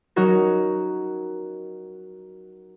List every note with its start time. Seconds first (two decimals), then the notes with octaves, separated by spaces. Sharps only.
0.16 F#3 C#4 D#4 F#4 A#4